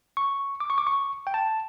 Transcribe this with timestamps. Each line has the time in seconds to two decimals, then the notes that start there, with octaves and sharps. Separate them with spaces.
0.17 C#6
0.60 D6
0.70 C#6
0.78 D6
0.87 C#6
1.27 G5
1.34 A5